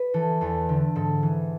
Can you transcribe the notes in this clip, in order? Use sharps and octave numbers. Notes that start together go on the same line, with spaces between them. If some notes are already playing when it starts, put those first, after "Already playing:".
Already playing: B4
E3 A4
E2 A4
D3
G#2 A4
E3